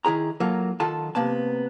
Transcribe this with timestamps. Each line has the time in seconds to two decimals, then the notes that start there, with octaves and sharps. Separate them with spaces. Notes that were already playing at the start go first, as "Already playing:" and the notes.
0.05 D#3 E4 G#4 A#5
0.40 F#3 A#3 F4 A4
0.80 D#3 F4 A4 F#5 A5
1.15 C3 A#3 B3 A5